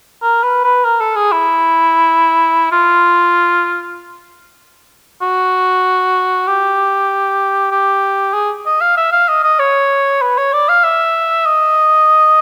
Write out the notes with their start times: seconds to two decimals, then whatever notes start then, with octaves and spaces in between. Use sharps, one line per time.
0.22 A#4
0.43 B4
0.64 B4
0.84 A#4
1.00 A4
1.16 G#4
1.32 E4
2.72 F4
5.22 F#4
6.47 G4
7.71 G4
8.34 G#4
8.66 D#5
8.81 F5
8.97 E5
9.12 F5
9.28 D#5
9.44 D#5
9.59 C#5
10.21 B4
10.38 C#5
10.53 D5
10.69 F5
10.84 E5
11.46 D#5